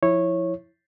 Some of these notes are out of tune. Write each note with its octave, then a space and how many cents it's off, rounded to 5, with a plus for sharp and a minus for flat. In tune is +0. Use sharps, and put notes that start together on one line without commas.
F3 +0 E4 +0 C#5 -15